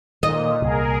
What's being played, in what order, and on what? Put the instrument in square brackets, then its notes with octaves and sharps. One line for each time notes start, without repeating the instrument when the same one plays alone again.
[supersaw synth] A#2 [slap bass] D#3 [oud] D#5
[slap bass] C2 A#2 [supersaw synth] G#4 A#4